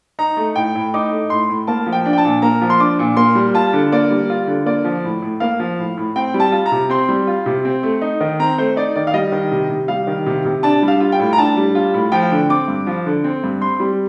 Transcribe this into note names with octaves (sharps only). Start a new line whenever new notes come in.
D#4 A#5
A3
A2 G5
A2
D#4 D6
A3
A2 C6
A2
A#3 A5
F3
G5
D4
G5
A5
A#2
A#3 A#5
F3
C6
D4 D6
A#2
A#3 C6
G3
F4 A5
D3
A#3 D5
G3
F4
D3
A#3 D5
F3
A2
A2
A#3 F5
F3
A2
A2
C4 G5
G3
A5
F4
A#5
C3
C4 C6
G3
F4
C3
C4
A3
D#4
D#3
C4 A#5
A3 C5
D#4 D5
D#3 D5
F5
G3 D#5
D#3
C3
C3
G3 F5
D#3
C3
C3
D4 A5
G3
F5
F4
G5
A2
A#5
D4 A5
G3
F4
A2
F3 G5
D3
C4 D6
G2
F3
D3
C4
G2
C4 C6
G3